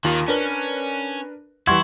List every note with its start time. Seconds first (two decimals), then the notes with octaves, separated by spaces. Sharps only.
0.05 D#2 D#3 F4 A#4
0.28 C#4 D4 A#4 B4
1.67 E3 G3 E4 F#5 C6 C#6 G#6